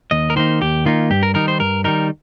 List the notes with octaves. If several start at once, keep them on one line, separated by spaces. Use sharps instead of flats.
D#2 D#5
A#4
D#3 A#3 D#4 C5
D#2 G4
D#3 A#3 D#4 F4
G2 G4
A#4
D#3 G3 D#4 A#4
C5
G2 A#4
D#3 G3 D#4 A#4